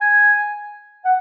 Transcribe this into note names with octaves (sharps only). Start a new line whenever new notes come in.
G#5
F#5